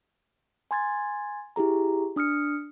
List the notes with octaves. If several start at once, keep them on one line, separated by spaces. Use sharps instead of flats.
G#5 C6 G#6 A6
E4 G4 G#4 A#5
D4 D#6 F6 C#7